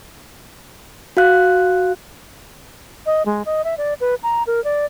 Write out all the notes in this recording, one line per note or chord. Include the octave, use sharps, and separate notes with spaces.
F#4 F5 F#6
D#5
G#3
D#5
E5
D5
B4
A#5
A#4
D5